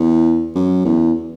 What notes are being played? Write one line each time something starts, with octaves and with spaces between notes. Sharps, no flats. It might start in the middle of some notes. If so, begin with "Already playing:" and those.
Already playing: E2
F#2
E2